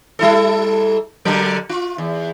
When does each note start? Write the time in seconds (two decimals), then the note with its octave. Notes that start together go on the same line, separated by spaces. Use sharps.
0.19 G3 E4 A4
1.25 D3 F#3 A#4
1.69 F4
1.98 E2